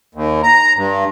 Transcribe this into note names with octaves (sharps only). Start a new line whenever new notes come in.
D#2
A#5
G2